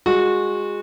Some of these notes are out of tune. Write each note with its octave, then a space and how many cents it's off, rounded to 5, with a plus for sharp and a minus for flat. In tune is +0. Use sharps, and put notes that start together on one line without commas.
G#3 -15 F#4 -20